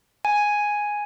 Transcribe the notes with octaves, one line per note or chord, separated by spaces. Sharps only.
G#5